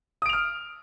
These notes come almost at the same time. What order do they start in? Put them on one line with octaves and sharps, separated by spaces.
D#6 D7 F7 F6